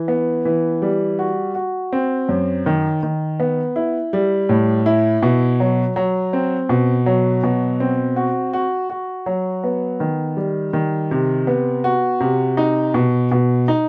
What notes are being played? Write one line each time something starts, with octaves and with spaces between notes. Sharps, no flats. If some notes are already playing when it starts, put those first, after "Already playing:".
Already playing: E3
B3
E3
G3
F#4
F#4
C4
F#2
D#3
D#3
B3
E4
G3
A2
E4
B2
F#3
F#3
C4
B2
F#3
B2
C4
F#4
F#4
F#4
F#3
B3
D#3
G3
D#3
C3
B3
F#4
C3
D#4
B2
B2
D#4